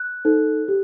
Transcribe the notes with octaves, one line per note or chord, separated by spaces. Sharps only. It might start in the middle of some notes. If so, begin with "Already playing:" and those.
Already playing: F#6
D#4 A4 C5
G4